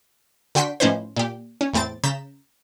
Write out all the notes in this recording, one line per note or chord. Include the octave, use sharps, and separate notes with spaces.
D3 F#4 G5 C6 B6
A2 F3 C#4 D#4 B4 C5
A#2 G4
C#4
E2 A2 C4 D6 A6
C#3 A#5 G6 A6 B6 E7